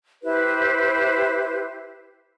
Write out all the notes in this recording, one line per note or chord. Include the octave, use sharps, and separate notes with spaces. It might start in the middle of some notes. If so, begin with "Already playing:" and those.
E4 G4 B4 C5